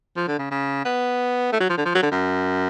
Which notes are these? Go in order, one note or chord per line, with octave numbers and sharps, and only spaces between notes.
F3
D3
C#3
C#3
B3
A3
F#3
F3
D3
F3
F#3
D3
F#2